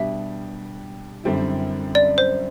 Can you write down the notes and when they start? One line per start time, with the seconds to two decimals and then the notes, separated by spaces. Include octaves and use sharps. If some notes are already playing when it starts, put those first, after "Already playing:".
Already playing: B2 G3 D4 G4 E5
1.24 F#2 D3 G3 C4 E4
1.95 D5
2.18 C5